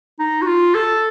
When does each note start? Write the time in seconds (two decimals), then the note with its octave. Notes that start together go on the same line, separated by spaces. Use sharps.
0.19 D#4
0.42 F#4
0.46 F4
0.75 A4